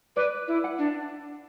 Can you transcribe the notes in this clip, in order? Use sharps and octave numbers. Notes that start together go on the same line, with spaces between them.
B4 D5
E4
F#5
D4